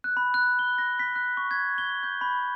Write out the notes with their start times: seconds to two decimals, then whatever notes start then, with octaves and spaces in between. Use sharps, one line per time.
0.04 F#6
0.17 B5
0.34 F#6
0.59 G7
0.78 A#6
0.99 B6
1.16 F#6
1.37 C#6
1.51 G#6
1.78 G7
2.03 G6
2.21 B5